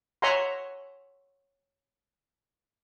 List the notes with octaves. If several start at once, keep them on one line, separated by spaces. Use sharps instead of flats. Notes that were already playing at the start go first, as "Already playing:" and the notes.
C#5 E5 F#5 G#5 A#5 C6